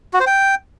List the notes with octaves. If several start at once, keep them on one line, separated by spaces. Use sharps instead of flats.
F#4
C5
G5